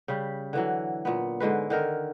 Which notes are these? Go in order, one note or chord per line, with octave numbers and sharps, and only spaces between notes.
C#3 G3
D3 E3 F#3
A#2 B3
G#2 D3 G#3 B4
D3 D#3 A#4